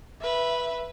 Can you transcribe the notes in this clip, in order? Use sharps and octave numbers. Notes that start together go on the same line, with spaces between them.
B4 E5